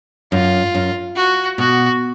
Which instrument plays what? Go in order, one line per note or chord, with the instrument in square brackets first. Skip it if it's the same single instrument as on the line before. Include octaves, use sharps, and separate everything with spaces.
[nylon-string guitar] F#2 [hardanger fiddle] F4
[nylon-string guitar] F#2
[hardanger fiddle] F#4
[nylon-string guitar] B2 [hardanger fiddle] F#4